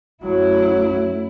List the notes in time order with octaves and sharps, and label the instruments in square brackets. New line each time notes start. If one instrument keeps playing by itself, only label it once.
[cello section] F#2 A3 E4 [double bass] F#3